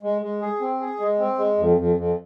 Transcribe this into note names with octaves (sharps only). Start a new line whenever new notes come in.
G#3
G#3
G#4
C4
G#4
G#3
C4
G#3
F2
F2
F2